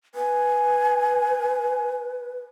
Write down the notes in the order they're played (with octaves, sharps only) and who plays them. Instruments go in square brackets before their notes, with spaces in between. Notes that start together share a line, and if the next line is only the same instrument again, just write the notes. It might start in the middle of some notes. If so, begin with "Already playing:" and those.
[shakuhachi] B4 [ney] G#5